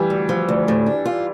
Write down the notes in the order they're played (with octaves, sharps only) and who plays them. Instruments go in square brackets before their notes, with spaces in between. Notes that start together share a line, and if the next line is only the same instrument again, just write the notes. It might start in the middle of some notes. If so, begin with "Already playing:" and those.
Already playing: [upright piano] E3 G3
[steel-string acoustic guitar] D2
F3
D2
A2
D4
F4